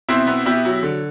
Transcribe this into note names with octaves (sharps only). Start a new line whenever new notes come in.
B2 C4 E4
B3
B2 E4 G4
F#3
D3